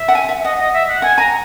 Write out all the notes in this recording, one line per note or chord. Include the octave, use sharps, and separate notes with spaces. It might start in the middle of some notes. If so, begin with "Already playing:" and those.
Already playing: E5
F#5
G#5
E5
E5
D#5 F#5
D#5
E5
F#5
F#5 G#5
G#5 A#5